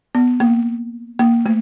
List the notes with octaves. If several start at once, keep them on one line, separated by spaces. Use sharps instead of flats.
B3
A#3
A#3
A3